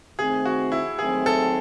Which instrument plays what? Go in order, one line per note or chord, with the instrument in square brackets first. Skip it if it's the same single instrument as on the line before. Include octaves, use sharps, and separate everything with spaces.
[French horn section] D#3 A3 C4 [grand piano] G#4
[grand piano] F#4
E4
[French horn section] D#2 D#3 F#3 A3 C4 [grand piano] G#4
[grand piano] A4